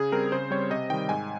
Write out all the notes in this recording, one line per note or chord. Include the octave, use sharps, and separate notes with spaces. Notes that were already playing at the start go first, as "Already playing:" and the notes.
Already playing: C#3 G#4
G3 C4 A#4
C#3 C5
G3 C4 C#5
C3 D#5
D#3 G3 G5
G#2 G#5